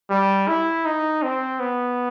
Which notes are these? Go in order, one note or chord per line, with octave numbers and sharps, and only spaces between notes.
G3
E4
D#4
C4
B3